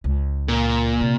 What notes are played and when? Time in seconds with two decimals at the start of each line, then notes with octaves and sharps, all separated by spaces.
0.04 C#2
0.48 A#2
1.01 C3